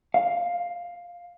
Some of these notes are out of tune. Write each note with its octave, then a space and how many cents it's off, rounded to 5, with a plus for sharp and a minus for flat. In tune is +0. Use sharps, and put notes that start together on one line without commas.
F5 +5